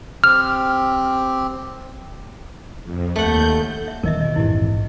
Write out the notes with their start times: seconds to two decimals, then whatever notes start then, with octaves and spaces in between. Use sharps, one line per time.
0.24 C4 G4 F6
2.84 F2
3.16 D#2 A3 F#5 G6
3.88 E5
4.03 D#1 E2 D#3 A#4 D#5 E5
4.21 B2 E3 D#5
4.36 A#1 F2 G#2 E3 E4 G4